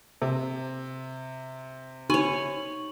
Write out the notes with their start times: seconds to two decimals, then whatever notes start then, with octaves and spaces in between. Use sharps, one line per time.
0.22 C3
2.10 D#4 C#5 G#5 C#6 F#7